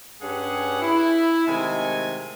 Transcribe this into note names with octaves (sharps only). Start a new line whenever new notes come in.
G2 C#4 G4 G#4 F#5
E4
C3 D#3 G#3 A3 G#5